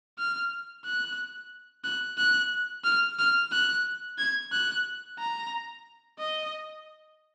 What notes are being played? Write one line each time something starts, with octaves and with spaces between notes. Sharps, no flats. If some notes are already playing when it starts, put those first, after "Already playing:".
F6
F#6
F#6
F#6
F6
F6
F#6
G#6
F#6
A#5
D#5